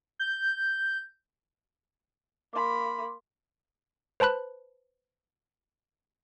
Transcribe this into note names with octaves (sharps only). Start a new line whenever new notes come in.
G6
A#3 B5 C6 D6
B4 C5 A5 B5 F#6